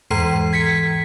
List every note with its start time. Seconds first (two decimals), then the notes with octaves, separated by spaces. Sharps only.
0.10 E2 G#2 E3 A#5 C7
0.53 G#6 B6 C#7